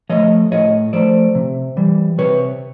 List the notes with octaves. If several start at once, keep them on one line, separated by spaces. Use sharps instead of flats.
F3 A3 C#5 D#5
A2 C#5 D#5
F3 A3 C5 D5
C3
E3 G3
C3 B4 C#5